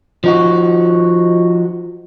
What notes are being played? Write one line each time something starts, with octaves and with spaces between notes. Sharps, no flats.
F3 D#4 F#4